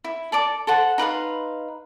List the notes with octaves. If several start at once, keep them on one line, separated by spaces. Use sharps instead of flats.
E4
A4 D5 D6
A4 C5 F#5
D#4 B4 F5 C6